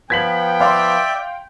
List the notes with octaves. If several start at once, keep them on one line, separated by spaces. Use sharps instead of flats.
F3 B3 G5 G#6 B6 F#7
D5 E5 F5 C6